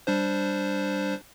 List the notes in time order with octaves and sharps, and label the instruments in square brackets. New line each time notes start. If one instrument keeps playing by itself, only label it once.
[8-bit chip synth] G3 D4 C5